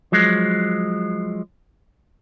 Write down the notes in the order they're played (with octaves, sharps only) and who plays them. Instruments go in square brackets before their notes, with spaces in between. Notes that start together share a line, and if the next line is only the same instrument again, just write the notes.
[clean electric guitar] F3 F#3 G#3